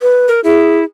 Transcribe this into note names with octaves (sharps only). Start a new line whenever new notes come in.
B4
A#4
E4 G#4